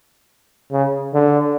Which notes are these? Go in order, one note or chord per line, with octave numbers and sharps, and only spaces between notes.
C#3
D3